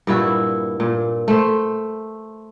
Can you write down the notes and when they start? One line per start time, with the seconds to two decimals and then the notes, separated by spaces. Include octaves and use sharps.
0.07 G2 A#2 E4 F#4
0.80 A#2
1.28 A3 C5